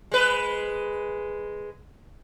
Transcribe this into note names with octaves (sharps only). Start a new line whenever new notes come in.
G#3 B4